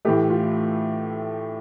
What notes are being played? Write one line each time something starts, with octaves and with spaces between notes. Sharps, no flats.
A2 E3 A3 G4
F4